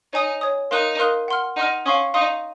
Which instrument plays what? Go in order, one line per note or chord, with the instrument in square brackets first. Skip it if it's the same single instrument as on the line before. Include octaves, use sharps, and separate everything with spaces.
[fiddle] D#4 [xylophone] C#5 G#5 D#6
[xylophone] C#5 G#5 D#6
[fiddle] D#4 [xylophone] A#4 F5 C6 D#6 F#6
[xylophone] A#4 F5 C6 D#6 F#6
F#5 C6 F6
[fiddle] D#4 [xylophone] F#5 C6 F6
[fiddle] C#4 [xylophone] F5 C6 D#6
[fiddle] D#4 [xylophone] F5 C6 D#6